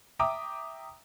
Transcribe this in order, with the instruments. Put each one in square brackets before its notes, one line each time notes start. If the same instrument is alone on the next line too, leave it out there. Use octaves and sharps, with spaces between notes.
[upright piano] E5 G5 A#5 D6 D#6